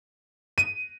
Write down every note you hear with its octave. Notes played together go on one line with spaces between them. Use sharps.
D#7